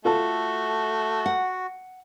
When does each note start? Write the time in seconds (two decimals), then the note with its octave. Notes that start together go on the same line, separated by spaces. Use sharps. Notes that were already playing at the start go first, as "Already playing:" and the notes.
0.05 A3 F4 F#4 A4 A5
1.26 F#5